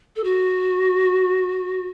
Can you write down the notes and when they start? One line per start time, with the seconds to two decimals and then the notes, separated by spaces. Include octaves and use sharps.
0.16 A4
0.24 F#4